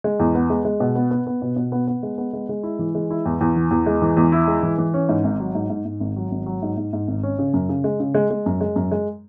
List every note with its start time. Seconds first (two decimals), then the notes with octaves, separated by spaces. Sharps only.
0.04 G#3
0.20 E2
0.35 B3
0.50 G#3
0.65 G#3
0.80 B2
0.95 B3
1.11 B3
1.27 B3
1.42 B2
1.56 B2
1.72 B3
1.87 B3
2.03 G#3
2.18 B3
2.33 G#3
2.49 G#3
2.63 E4
2.79 E3
2.95 G#3
3.11 E4
3.26 E2
3.41 E2
3.56 E3
3.71 E2
3.86 G#3
4.02 E3
4.17 E2
4.32 E4
4.47 G#3
4.63 E3
4.78 E3
4.94 C#4
5.09 G#2
5.24 G#1
5.40 F#3
5.55 G#2
5.70 G#2
5.85 G#2
6.00 G#1
6.16 F#3
6.31 G#1
6.46 F#3
6.62 G#2
6.77 G#2
6.93 G#2
7.08 G#1
7.23 C#4
7.39 C#3
7.54 F#2
7.69 C#3
7.84 G#3
8.00 C#3
8.15 G#3
8.31 G#3
8.46 F#2
8.61 G#3
8.76 F#2
8.91 G#3